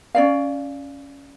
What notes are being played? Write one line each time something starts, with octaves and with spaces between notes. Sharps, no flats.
C#4 D5 F5